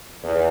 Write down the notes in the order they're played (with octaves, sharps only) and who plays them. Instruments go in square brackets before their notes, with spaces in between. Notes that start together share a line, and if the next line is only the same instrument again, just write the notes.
[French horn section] E2